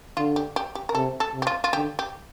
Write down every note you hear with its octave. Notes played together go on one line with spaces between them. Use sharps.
D3 F4
G4
G4
G4
A#4
C3 A4
A4
C3
G4
F4
F4
D3 G4
G4